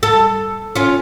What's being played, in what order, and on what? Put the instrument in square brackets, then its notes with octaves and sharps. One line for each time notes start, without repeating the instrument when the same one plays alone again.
[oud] A4
C#4 F4